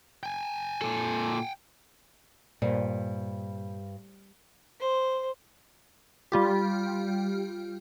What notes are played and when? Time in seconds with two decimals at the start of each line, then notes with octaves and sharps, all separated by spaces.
0.23 G5 G#5
0.81 A#2 A4
2.62 G2 A#2 C5 D5
4.80 C5
6.32 G3 F4 G4